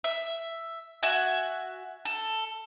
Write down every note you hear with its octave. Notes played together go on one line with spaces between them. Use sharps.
E5
F#4 E5 G#5
A4